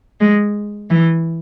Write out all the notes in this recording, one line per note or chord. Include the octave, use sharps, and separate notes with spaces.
G#3
E3